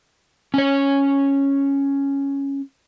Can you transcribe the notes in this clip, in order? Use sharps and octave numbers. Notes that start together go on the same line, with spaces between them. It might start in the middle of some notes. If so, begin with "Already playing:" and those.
C#4 C#5